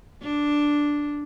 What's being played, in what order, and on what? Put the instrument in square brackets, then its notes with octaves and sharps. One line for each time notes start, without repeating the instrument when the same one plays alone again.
[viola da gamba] D4